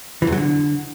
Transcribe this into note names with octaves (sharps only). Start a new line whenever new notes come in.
E3
E2
F#3
D3